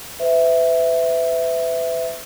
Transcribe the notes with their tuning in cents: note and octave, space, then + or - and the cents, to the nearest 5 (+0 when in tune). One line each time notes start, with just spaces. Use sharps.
B4 +40 E5 +0